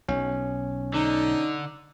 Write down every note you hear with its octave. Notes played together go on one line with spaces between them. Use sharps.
B1 C#4
D3 D#4